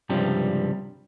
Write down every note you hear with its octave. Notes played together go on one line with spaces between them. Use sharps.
C#2 G2 C3 F3 G3